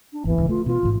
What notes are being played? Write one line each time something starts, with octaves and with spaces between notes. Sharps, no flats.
D4
G#1 E2 E3
D1 C#2
A3 F4
B2 B3 F4
A1 G#2